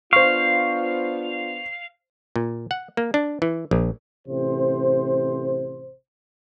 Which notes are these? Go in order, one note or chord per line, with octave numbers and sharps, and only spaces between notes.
B3 D4 F4 C5 F5 C#6
A#2
F#5
A#3
D4
E3
A#1
A1 C3 C5